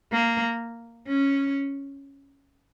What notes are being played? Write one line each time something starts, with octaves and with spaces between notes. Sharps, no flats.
A#3
C#4